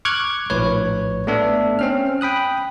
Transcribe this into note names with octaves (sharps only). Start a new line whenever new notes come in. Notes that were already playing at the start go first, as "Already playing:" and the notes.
C#6 D6 F6 F#6 G#6
A#1 A2 B4 C#5
A3 B3 D4 E5
C4 C#4 F6
G5 B5 D#6 F#6